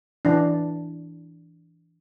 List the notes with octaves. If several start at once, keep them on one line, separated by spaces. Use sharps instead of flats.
E3 D4